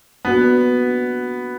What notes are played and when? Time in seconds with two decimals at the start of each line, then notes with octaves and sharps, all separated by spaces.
0.25 A#3 B3 D4 F#4 B4